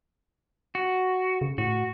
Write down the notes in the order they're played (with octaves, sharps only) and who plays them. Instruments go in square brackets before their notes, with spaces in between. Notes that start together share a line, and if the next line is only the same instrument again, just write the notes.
[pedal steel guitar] F#4
[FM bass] C#3
[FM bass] A2 [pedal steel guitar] F#4